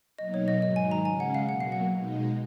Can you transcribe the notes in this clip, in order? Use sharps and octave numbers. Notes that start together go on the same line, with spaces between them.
B2 F#3 A#3 D#4 D#5
C#5
D#5
G#2 D#3 F#3 D#5
G#5
A#5
C#3 G#3 C#4 G#5
F#5
F5
B2 F#3 A#3 F#5
F5
F#5
B2 G#3 D#4